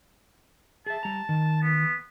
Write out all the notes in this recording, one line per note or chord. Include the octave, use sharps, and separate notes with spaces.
G#4 E5 A5
G3 A#5
D#3
B3